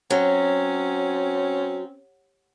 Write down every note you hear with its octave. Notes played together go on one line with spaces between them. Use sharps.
F#3 C4 C#4